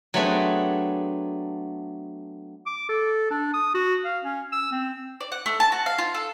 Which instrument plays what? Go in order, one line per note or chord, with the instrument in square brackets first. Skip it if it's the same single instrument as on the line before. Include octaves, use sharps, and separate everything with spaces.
[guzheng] F#3 A3 B3 C4 D4 G#4
[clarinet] D6
A4
D4
D#6
F#4
F5
C#4
E6
C4
[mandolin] D5
F#5
A3
A5
F#4
F5
F4
A4